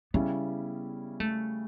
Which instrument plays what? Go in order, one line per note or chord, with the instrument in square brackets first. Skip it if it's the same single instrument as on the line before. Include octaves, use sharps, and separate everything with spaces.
[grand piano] C#3 G3 C#4 E4 [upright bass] B3
[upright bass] A3